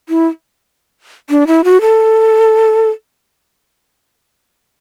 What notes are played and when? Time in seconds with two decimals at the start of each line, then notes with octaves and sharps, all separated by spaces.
0.09 E4
1.30 D4
1.47 E4
1.64 F#4
1.81 A4